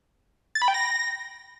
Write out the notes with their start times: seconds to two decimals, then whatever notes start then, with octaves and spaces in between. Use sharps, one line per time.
0.55 A6
0.62 B5
0.68 G5
0.74 A#6